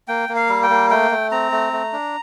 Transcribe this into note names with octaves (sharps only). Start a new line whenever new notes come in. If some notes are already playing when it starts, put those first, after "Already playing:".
A#3 G5
A#3
F5
G3
G5
A#3
A3 G5
A3
C4 A#5
A3
A3
D4